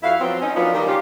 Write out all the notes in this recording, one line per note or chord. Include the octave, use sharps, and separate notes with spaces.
F2 E4 F#4 F5
F3 F#3 B3 C4
C#4 D#4
F3 F#3 A#3 B3 D4 F4
D#3 G3
C#3 G3 F4 G4